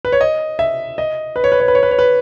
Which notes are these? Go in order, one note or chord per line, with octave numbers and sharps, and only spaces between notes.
B4
C#5
D#5
E5
D#5
B4
C#5
B4
C#5
B4
C#5
B4
C#5
B4